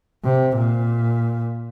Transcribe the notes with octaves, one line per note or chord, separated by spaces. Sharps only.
C3
A#2